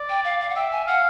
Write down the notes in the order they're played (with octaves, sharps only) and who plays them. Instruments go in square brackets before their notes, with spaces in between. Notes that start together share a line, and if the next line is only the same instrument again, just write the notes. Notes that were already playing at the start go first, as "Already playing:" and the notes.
Already playing: [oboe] D5
[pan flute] G5
F5
F5
F#5
[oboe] E5 [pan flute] G5
[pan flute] G#5
[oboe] F5 [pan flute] F#5